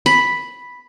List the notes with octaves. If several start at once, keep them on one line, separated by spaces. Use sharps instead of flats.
B5